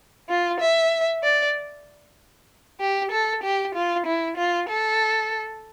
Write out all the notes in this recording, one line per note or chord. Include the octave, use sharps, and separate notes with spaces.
F4
E5
D5
G4
A4
G4
F4
E4
F4
A4